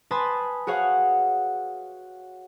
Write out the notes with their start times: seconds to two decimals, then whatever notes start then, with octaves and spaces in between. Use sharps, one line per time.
0.11 B4 G#5 A5 B5 C6 D#6
0.67 F#4 G#4 C#5 F5 F#5